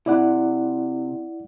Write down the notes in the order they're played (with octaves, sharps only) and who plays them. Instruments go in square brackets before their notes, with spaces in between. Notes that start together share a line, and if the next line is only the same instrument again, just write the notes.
[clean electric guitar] C3 [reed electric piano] E4 D5 F#5